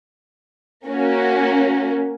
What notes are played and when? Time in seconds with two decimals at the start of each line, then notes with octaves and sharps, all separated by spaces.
0.87 A#3 C#4 F#4 A#4